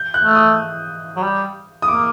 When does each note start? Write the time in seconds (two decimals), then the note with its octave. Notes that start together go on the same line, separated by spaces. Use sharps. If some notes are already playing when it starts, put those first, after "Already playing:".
Already playing: G6
0.14 F#6
0.25 A3
0.35 D#6
1.17 F#3
1.23 G3
1.82 D#6
1.88 A#3 D6